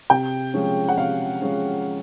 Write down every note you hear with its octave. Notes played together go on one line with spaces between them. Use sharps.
C3 G5
F3 G#3 C#4
F#5
C3 F5
F3 G#3 C#4